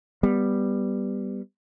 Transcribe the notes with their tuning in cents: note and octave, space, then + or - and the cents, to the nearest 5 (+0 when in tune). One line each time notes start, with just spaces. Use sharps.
G3 +5 B3 +0